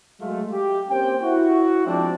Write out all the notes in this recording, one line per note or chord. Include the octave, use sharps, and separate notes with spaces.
F#3 G#3 A3 F4
G4
A#3 C4 C#4 G4 C5 G5
E4 F#4
F3 G#3 C4 D4